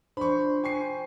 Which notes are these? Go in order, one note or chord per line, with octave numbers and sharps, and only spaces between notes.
F3 D4 C5 B5 C#6
G5 G#5 C#6 C7